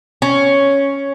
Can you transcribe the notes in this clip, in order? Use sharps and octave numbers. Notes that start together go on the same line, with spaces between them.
C#4